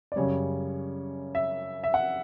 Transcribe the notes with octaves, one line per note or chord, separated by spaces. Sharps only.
D5
F#2 C#3 G3 C#5
E5
E5
F#5